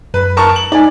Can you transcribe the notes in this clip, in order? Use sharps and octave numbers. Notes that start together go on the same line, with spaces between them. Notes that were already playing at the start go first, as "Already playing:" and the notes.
F#2 B4
A#4 A5 C#6
F#7
D#4 D5 G#5